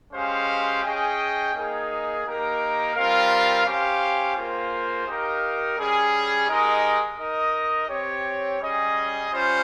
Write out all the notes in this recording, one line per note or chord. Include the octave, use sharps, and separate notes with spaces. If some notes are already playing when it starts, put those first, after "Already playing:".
G#3 C#4 G4 C5 F5
C#4 G#4 D#5 G5
A#3 D#4 G#4
A#3 D#4 G4 A#4
G3 C4 F4 A#4 F5
C#4 G4 C5 F5
A#3 F4 G#4 C5
D#4 G4 A#4 F5
G3 C#4 G#4
G#3 D#4 G4 A#4 D#5
D#4 A#4 D#5
C4 G4 C#5
G3 C#4 G#4 D#5
G3 C#4 F4 C5